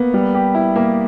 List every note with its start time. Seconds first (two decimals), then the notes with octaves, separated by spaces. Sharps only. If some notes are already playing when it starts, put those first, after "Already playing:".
Already playing: A#3 B3
0.14 G3
0.34 G4
0.54 E4
0.76 A#3